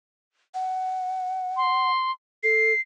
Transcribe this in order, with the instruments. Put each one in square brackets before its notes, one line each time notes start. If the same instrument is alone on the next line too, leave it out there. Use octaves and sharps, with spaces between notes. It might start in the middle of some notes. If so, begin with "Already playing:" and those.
[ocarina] F#5
[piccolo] C6
[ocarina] A4 [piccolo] C7